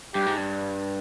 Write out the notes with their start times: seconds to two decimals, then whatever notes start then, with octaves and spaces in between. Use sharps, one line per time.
0.15 G2 G4
0.26 G#2
0.37 G2